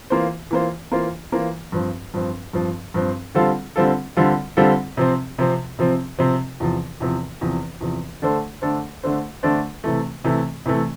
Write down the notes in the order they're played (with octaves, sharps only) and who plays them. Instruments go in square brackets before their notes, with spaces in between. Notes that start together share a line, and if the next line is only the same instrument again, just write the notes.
[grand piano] E3 A#3 F4 C5
E3 A#3 F4 C5
E3 A#3 F4 C5
E3 A#3 F4 C5
G2 F3 C4
G2 F3 C4
G2 F3 C4
G2 F3 C4
D3 G3 C4 F4 A4
D3 G3 C4 F4 A4
D3 G3 C4 F4 A4
D3 G3 C4 F4 A4
C3 F3 C4
C3 F3 C4
C3 F3 C4
C3 F3 C4
E2 C3 F3
E2 C3 F3
E2 C3 F3
E2 C3 F3
D3 A3 D4 A4 C5
D3 A3 D4 A4 C5
D3 A3 D4 A4 C5
D3 A3 D4 A4 C5
C3 E3 A3
C3 E3 A3
C3 E3 A3